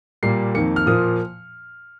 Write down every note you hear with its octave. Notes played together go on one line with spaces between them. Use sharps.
A#2 G3 A#3 C7
F2 D#3 A#3 C#7
F6
A#2 F3 A#3 D#6